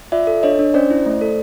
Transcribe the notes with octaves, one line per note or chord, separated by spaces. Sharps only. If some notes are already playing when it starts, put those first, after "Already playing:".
F4 D5 E5
A4
D4 C#5 D#5
D4
C#4 C5 D5
E4
A3
A4